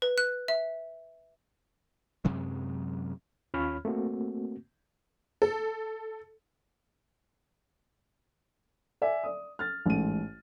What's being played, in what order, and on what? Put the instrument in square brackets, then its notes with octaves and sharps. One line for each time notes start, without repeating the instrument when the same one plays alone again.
[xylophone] B4
F#6
E5
[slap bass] F#2 C3 F#3 G#3
[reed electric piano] D#2 C#4 F4 C#5 B5 F6
A3 A#3 C4 F#4
[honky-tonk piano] A4
[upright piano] D5 E5 G#5
D5 D#6
F6 A6
A1 G#2 D#7